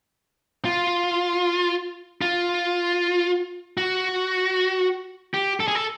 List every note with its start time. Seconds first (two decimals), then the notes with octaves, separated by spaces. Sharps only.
0.65 F4
2.21 F4
3.77 F#4
5.34 G4
5.60 A4
5.68 G#4
5.75 A4